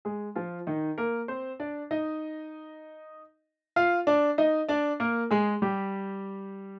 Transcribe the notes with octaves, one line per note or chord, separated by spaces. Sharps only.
G#3 G#4
F3 F4
D#3 D#4
A#3 A#4
C4 C5
D4 D5
D#4 D#5
F4 F5
D4 D5
D#4 D#5
D4 D5
A#3 A#4
G#3 G#4
G3 G4